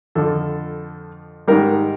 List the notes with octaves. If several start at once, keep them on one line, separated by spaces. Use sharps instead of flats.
F2 D3 F3 A4
G#2 D#3 G3 A#4